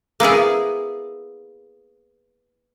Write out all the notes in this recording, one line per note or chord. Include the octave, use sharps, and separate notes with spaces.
A#3 B3 E4 G#4